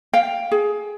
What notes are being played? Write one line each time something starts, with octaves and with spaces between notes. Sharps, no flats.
F5 G5
G#4